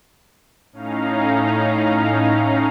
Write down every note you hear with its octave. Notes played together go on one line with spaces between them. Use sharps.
A2 C#4 D#4 F5 A#5